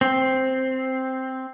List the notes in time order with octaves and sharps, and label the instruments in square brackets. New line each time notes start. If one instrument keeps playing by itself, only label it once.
[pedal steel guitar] C4